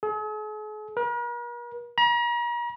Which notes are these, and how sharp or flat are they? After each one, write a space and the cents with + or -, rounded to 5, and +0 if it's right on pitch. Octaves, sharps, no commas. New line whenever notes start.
G#4 +45
A#4 +45
A#5 +40